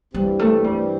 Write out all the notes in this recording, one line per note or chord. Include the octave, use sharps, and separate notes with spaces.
G2 E3 G3 C4 G4
A3
G3